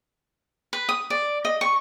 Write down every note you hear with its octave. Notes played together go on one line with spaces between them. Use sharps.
B4
D#6
D5
D#5
C#6